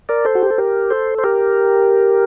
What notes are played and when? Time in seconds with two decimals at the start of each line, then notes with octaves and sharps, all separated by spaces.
0.09 A#4 D5
0.25 A4 C5
0.35 F#4
0.43 G4
0.51 A4
0.58 G4 A#4
0.90 A4 C5
1.18 C5
1.24 G4 A#4